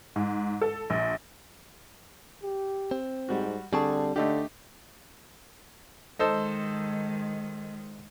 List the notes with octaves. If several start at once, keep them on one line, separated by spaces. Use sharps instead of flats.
G#2
A4
A#1
G4
C4
G#2 G3 F#4
D3 G3 C4 G#4 A5 C#6
D3 A3 D4 D#4 G4
D#3 G#3 D#4 A4 C5